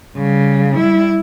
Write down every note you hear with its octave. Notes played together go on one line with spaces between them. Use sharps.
C#3 G3
G3 E4